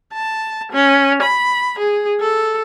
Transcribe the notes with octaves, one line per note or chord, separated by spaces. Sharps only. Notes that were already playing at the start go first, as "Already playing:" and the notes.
A5
C#4
B5
G#4
A4